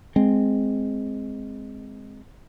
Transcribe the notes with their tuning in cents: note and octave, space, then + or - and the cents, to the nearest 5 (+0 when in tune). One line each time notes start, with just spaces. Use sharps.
G#3 +0 C4 +0